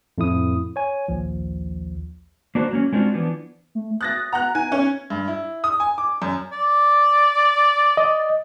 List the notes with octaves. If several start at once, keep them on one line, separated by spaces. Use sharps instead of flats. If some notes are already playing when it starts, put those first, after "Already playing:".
F2 A2 E4 D#6
C#5 G#5
A#1 D#2 F3
A#3 D4 F#4 A#4 C5
F#3 A#3 C#4
G#3 A3 C4 D4 F4 F#4
E3 F3 B3 D4
A3
D#6 F#6 A6 A#6
F#5 A#5 F#6
D#4 G#5
C#4
G2
E4
D#6
G#5
D6
F#2
D5
D#5